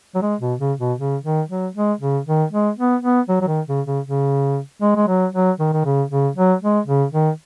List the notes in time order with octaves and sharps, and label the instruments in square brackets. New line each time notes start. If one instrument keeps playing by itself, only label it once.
[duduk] F#3
G#3
B2
C#3
B2
C#3
D#3
F#3
G#3
C#3
D#3
G#3
B3
B3
F#3
F#3
D#3
C#3
C#3
C#3
G#3
G#3
F#3
F#3
D#3
D#3
C#3
C#3
F#3
G#3
C#3
D#3